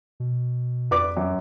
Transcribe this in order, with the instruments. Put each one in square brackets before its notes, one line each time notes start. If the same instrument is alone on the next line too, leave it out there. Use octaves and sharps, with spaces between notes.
[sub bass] B2
[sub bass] F2 [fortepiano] B4 D5 D6
[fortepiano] F#2